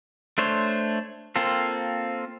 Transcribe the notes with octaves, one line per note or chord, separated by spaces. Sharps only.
A3 D4 C5 C#5
A#3 C4 F4 A4